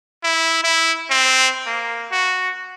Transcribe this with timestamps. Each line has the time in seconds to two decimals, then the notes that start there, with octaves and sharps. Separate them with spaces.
0.23 E4
0.64 E4
1.10 C4
1.66 A#3
2.11 F#4